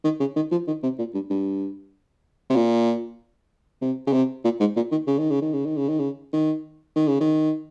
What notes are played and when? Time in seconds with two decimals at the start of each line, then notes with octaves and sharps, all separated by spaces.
0.04 D#3
0.20 C#3
0.36 D#3
0.51 F3
0.67 D#3
0.83 C3
0.98 A#2
1.14 G2
1.30 G2
2.50 C3
2.56 A#2
3.81 C3
4.07 C#3
4.13 C3
4.44 A#2
4.60 G#2
4.76 A#2
4.91 D#3
5.07 C#3
5.18 D#3
5.30 C#3
5.42 D#3
5.53 C#3
5.65 D#3
5.77 C#3
5.88 D#3
5.99 C#3
6.33 D#3
6.95 D#3
7.08 C#3
7.20 D#3